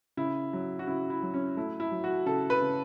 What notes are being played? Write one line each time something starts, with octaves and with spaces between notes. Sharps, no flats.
C#3 E4
F#3
F#4
C#3 E4
E4
F#3
C#4
A3 E4
E4
F#3
F#4
C#3 A4
B4
C#3